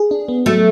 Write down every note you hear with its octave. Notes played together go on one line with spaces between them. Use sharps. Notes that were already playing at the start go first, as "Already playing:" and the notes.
Already playing: G#4
D4
B3
F#3 A3